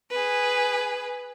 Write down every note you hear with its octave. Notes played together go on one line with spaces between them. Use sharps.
G#4 B4